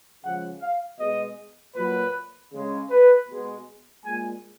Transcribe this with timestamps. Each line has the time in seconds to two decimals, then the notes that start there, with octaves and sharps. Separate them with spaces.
0.23 C#3 F3 G#3 F#5
0.61 F5
0.99 B2 G#3 D#5
1.76 A#2 F#3 B4
2.53 C#3 G#3
2.90 B4
3.28 B2 G#3
4.05 A#2 G#3 G#5